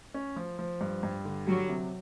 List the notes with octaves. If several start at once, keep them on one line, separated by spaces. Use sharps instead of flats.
C#4
F3
F3
G2
G2
D3
F#3 G3
C3